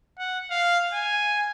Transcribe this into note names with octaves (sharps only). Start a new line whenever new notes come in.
F#5
F5
G#5